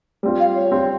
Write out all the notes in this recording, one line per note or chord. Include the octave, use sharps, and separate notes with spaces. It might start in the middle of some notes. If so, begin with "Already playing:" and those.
G3 C4 F4
F5
C#5
G3 C4 F4